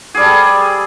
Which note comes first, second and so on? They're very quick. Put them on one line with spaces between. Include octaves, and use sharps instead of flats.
G#4 G3 A4